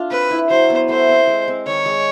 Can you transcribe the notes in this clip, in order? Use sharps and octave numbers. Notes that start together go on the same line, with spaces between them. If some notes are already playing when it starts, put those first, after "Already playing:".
Already playing: A3 D4 F4
C4 B4
E4
F#3 C5
B3
A3 C5
C4
G#3
C4
D#3 C#5
G#3